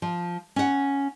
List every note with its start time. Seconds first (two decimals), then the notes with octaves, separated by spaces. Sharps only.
0.02 F3
0.56 C#4 F#5